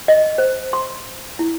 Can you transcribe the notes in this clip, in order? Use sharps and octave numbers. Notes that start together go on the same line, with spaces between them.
D#5
C5
C6
E4